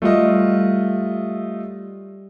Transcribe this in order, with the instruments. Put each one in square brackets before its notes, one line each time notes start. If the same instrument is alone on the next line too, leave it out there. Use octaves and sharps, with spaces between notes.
[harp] G3 [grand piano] A3 F4 D#5